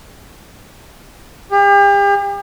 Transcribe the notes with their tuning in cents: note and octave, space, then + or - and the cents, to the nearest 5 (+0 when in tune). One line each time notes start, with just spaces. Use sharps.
G4 +40